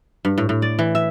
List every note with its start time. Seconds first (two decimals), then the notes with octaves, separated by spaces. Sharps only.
0.25 G2
0.38 A2
0.49 A2
0.62 D5
0.79 E3
0.95 E5